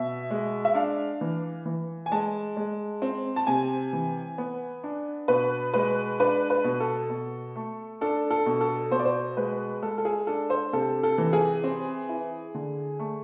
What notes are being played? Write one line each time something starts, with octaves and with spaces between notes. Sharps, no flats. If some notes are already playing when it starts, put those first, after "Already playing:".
Already playing: B2 E5
G#3
E5
D4 F5
E3
E3
G#5
G#3 A5
G#3
C4
A5
C3 G#5
E3
B3
D4
B2 B4
G#3 B4
D4 B4
B4
B2
A4
B2
A3
D4 A4
A4
B2
A4
B2 C5
D5
C5
G#3 B4
G#3 A4
A4
G#4
D4 A4
C5
C3 A4
A4
E3
G#4
C4
E4
D3
A3